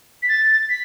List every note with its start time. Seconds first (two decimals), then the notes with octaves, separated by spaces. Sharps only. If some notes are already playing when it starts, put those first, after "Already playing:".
0.23 B6
0.29 A6
0.69 B6